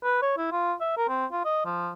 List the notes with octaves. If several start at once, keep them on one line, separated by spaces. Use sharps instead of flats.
B4
C#5
E4
F4
E5
A#4
C4
F4
D#5
F3